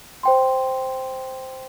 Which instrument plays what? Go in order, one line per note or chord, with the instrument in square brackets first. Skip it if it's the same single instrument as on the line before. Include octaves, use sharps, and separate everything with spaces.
[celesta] C5 G5 C6